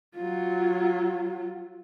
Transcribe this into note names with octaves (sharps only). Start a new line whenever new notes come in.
F#3 F4